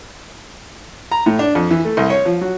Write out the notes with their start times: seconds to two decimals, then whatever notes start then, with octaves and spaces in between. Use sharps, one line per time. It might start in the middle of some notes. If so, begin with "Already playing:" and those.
1.11 A#5
1.26 A2
1.39 D4
1.55 F2
1.71 E3
1.85 A3
1.97 C2
2.10 C#5
2.26 F3
2.41 F#3